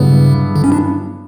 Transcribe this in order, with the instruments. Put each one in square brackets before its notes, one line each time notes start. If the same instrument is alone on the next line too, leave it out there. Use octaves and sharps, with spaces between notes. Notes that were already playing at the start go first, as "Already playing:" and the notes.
Already playing: [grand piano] G2 F#3 B3 E4 [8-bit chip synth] C#3
[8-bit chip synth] D3
C#4
D4